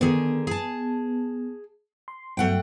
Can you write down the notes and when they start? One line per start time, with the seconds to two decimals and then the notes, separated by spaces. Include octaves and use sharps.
0.01 D3 D#3 B3 G#4
0.47 G#4 A5
2.08 C6
2.37 G2 F#3 A3 F#5 G5